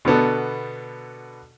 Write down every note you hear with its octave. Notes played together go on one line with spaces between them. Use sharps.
B2 D3 B3 A4